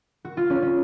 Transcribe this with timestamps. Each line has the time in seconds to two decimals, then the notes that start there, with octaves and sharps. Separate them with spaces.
0.25 F#4
0.37 F4
0.50 C#4
0.62 C#4